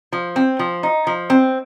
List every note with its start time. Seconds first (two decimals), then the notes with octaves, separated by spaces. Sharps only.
0.13 F3
0.36 C4
0.59 F3
0.83 D#4
1.07 F3
1.30 C4